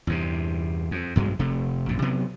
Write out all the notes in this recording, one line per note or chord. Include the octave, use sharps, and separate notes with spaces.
E2 G2 C3
F2
B1 G2 F#3 G#3
F1 C3 A3
A#1 F#2 A#2
C3 F#3 B3